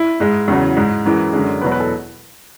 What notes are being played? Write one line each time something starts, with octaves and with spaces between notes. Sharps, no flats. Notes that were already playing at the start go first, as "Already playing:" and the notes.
Already playing: E4
G#2 G#3
E2 C#3 F#3
G#2 G#3
F#2 E3 G#3
F#2 D3 G#3
E2 B2 F#3 B4
B4
A4